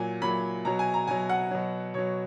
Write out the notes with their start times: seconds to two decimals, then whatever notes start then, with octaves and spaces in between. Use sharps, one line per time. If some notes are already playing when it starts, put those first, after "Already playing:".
Already playing: A#2 F#3 G#5
0.22 A#2 F#3 B5
0.65 B2 F#3 A#5
0.79 G#5
0.94 A#5
1.07 B2 F#3 G#5
1.29 F#5
1.51 B2 F#3
1.94 B2 F#3 C#5